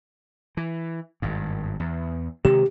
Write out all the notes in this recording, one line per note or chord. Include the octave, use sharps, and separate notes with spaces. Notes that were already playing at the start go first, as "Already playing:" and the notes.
E3
G#1 G2
E2
C3 D#3 G#3 G4